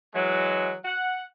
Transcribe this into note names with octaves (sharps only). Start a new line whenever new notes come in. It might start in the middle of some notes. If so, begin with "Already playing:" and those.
E3 F#3 G#3
F#5